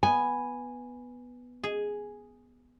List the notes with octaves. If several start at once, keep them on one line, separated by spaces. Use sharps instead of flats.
B3 G#5
G#4